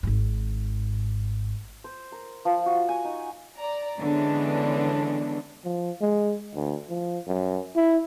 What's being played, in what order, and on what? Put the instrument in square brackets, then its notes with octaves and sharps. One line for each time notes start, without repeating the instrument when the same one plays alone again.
[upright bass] G#1 G#2
[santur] C5
A#4
F3
F#4
G#5
D#4
[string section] D5 A#5
D3 E3 G#3 B3 C#4 D4
[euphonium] F3
G#3
D2
F3
F#2
E4